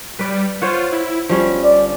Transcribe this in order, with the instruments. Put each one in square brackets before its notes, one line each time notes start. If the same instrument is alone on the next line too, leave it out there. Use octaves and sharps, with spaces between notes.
[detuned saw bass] G3 [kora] B4 D5
[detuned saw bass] F4 [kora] C5 C#5 F#5
[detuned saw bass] E4
[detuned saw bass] G1 [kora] F3 G3 C#4
[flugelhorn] D5